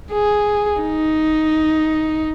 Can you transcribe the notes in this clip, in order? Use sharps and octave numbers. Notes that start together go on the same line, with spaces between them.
G#4
D#4